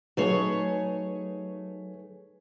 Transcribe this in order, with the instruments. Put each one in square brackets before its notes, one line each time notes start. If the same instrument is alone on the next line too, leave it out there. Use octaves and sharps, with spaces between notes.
[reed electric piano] F#3 D#4 B4 [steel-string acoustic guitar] A3 G#4 C#5